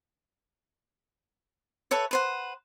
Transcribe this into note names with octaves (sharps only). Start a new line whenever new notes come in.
A4 B4 C#5 E5
B4 C5 F#5